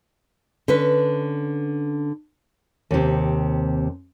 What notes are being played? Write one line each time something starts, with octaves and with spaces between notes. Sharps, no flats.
D3 C#4 B4
D#2 C3